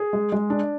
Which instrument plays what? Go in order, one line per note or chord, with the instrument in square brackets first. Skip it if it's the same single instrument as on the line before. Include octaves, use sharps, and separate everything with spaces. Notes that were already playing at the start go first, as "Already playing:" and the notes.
Already playing: [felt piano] G#4
G#3
G#3
D4